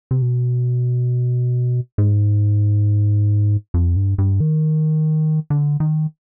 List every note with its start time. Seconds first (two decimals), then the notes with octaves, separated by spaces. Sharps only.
0.11 C3
0.22 B2
1.98 G#2
3.74 F2
3.96 G2
4.18 G2
4.40 D#3
5.50 D3
5.80 D#3